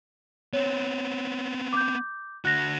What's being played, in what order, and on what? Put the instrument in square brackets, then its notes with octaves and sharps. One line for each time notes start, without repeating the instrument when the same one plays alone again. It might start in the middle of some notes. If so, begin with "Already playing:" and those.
[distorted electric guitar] B3 C4 [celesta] C#5
[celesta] D6 G6
[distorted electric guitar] D3 F#4 [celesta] F#6 A#6